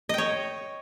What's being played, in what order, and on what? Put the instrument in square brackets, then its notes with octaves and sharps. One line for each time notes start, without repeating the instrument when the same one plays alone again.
[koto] D#5
G5
C#5